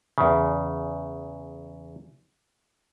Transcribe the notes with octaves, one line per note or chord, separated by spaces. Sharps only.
E2 C#3